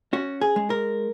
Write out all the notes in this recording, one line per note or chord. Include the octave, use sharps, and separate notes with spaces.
C#4 F#4
G#4
G#3
A#4